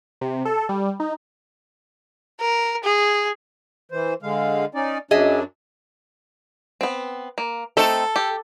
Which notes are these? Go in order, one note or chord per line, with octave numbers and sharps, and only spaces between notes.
C3
A4
G3
D#4
A#4
G#4
E3 C5
D3 G#3 F5
C#4 D#4 D5
F#2 F#3 D4 G#4 D#5 E5
B3 C4
A#3
A3 C4 D#4 A4
G4